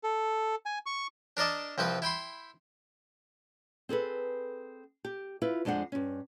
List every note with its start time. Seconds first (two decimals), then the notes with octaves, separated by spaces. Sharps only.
0.03 A4
0.66 G#5
0.86 C#6
1.37 D4 A#4 D5 D#5 A5
1.78 C2 F3 C4 B4
2.02 E4 G5 B5 C6
3.89 C4 G#4 A4 B4
5.04 G4
5.42 E4 F4 B4
5.65 F2 G#3 D4 C5 F#5
5.92 G2 C#4